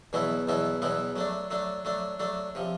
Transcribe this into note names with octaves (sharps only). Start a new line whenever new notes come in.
E2 B2 F#3 B3 E4
E2 B2 F#3 B3 E4
E2 B2 F#3 B3 E4
F#3 A3 D4
F#3 A3 D4
F#3 A3 D4
F#3 A3 D4
C3 F3